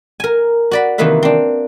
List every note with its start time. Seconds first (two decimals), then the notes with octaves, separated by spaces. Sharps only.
0.20 A#4 G#5
0.71 F#4 D5 B5
0.98 C3 D#3 E3 A#3 B4 E5
1.23 C4 D4